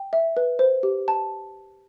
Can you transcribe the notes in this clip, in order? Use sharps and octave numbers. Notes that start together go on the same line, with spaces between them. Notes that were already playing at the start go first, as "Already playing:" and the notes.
Already playing: G5
E5
B4
C5
G4
A5